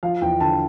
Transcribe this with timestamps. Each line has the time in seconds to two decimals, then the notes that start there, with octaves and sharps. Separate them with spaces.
0.03 F3 F5
0.21 E2 G5
0.40 D3 A5